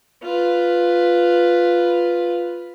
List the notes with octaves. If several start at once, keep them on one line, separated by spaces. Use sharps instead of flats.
F4 B4